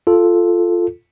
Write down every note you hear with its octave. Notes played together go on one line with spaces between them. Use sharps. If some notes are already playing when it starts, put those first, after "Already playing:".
F4 A4